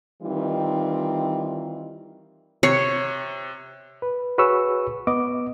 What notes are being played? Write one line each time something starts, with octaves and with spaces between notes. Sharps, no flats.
D#3 E3 G3 C4 D#4 F4
C3 C#5 C7 C#7
B4
F#4 G#4 B4 C#5 C#6 E6
B3 D#5 D6